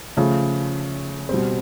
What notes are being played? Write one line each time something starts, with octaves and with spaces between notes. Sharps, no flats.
C#3 F3 A3
B2 G3 C4